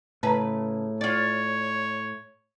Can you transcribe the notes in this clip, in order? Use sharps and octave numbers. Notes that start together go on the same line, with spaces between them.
A2 C#3 B4 A5 A#5
F4 C#5 D5